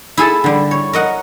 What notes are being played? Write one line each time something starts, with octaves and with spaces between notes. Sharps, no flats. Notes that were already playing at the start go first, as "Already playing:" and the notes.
E4 G#4 A4 A5
D3 G3
C#5
A#4 D#5 F#5